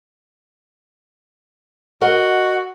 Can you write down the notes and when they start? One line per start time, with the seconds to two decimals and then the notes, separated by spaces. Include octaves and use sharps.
2.01 F#4 A#4 D#5 F#5